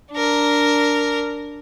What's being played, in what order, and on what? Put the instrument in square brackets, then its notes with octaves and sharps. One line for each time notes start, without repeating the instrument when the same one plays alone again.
[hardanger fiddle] D4 A#4